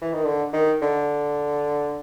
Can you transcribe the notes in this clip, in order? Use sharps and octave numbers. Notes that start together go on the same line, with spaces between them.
E3
D#3
D3
D#3
D3